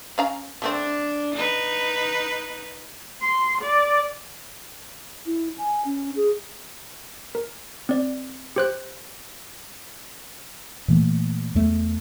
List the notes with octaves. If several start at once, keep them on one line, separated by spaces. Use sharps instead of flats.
C#4 F5 A#5
G3 A3 C4 D4
D#4 B4
C6
D5
E4
G#5
C#4
G#4
A#4
C4 D5
G4 C5 F#6
A#2 E3 A3 A#3
E2 A3